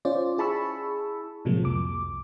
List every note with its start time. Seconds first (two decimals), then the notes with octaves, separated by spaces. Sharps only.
0.05 C#4 F4 C5 D5
0.38 E4 G#4 A5 B5 C#6 E6
1.45 A2 C3 F3 F#3 G#3 A#3
1.63 C2 F2 D6